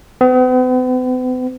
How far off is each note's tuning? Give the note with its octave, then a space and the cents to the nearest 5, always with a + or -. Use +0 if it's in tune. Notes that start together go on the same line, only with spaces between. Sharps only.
B3 +45